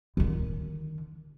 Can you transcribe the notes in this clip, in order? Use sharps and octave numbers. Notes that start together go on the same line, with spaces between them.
D3 D#3